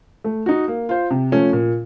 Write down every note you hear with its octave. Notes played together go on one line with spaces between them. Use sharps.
A3
D#4 F#4
A#3
F4 C5
C3
F3 A3 C#4
A#2